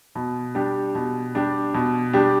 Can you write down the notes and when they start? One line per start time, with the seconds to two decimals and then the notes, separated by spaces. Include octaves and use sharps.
0.15 B2
0.55 G3 D4 G4
0.95 B2
1.35 G3 D4 G4
1.74 B2
2.13 G3 D4 G4